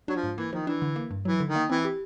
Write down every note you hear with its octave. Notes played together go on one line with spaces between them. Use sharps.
F#3 D4
F3
G#2
E3 A#3
D#3 F3
E3 D4
D3
A#3
G2
E3 F#3
D3
D#3
A#3
E3 C4
G4